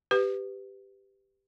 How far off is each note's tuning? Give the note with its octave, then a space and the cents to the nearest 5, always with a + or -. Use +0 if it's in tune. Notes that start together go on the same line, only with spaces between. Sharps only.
G4 +0 B4 +20